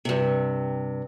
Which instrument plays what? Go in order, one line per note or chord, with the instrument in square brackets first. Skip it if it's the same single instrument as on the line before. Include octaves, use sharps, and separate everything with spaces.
[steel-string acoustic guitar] G2 C3